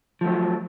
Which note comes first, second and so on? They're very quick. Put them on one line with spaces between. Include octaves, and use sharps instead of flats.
F3 A3 F#3